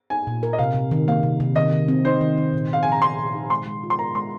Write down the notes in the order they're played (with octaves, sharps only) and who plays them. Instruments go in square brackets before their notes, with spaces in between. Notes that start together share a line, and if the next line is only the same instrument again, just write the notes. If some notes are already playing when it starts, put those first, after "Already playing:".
[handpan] D#4 [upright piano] G#5
[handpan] A#2
A#4
[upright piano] D#5
[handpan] C3 [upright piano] F5
[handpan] C3
D#3
[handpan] A#3 [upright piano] F5
[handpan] C3
C3
[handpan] D#3 [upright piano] D#5
[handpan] D#3
C4
[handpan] D#4 [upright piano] C5
[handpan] D#3
D#3
A#2
[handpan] D#4 [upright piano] F5
[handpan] F3 [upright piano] G#5
[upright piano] A#5
[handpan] C4 [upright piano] C6
[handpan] A#2
D#4
[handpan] G#3 [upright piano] C6
[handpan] G#3
F4
[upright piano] C6
[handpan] A#4 [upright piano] A#5
[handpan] G#3 [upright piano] C6